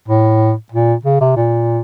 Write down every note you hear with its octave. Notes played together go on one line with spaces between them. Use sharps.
A2
A#2
C#3
C3
A#2